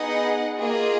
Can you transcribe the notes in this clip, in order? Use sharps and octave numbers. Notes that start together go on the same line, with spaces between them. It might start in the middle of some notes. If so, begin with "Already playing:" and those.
Already playing: B3 D#4 G#4 D#5 F#5
A#3 F4 G#4 D#5